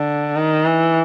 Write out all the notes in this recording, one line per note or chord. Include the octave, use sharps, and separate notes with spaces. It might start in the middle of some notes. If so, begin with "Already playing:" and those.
Already playing: D3
D#3
E3